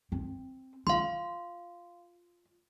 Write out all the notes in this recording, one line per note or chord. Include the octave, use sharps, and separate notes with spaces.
C4
F4 F5 C6